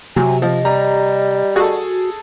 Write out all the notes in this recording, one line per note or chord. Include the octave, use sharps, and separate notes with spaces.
C3 F#3 G#5
F3 D#5
G3 A#5
F#4 G#4 A4